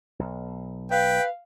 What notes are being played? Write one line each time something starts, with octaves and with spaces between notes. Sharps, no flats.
B1
B4 F5 G5